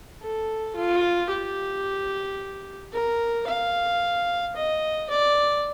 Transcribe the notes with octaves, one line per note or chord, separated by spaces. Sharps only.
A4
F4
G4
A#4
F5
D#5
D5